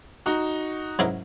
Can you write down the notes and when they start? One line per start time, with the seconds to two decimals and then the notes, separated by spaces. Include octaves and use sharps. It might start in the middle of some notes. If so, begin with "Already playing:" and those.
0.26 D#4 F#4
0.99 G#2 F#3 C#4 E4 A#4